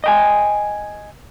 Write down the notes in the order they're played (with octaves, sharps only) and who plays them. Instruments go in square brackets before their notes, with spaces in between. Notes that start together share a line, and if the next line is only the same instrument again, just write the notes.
[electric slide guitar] D#5 G5 G#5